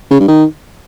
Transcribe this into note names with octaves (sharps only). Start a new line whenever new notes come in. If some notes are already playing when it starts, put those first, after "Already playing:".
C#3
G2
D#3